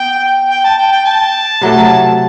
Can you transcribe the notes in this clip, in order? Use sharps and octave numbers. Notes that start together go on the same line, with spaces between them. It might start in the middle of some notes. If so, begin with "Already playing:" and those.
Already playing: B3 G5
G5
A5
G5
G5
A5
C3 F#3 A3 E4